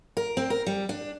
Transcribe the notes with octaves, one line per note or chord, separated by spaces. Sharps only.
A#4
C4
A#4
G3
D4